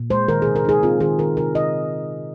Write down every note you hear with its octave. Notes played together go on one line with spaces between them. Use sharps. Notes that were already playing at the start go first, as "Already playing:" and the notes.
Already playing: A#2
G#3 C5
D#3 A#4
G#4
C3
A#4
D#4 G#4
C4 F4
D#3 G#4
D#3 A#4
C3 A#4
C3 D#5